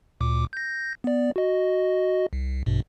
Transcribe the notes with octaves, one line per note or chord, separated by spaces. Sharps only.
D2 A#2 D6
G6 A#6
B3 D5
F#4 D#5
C2
A#1 G2 B2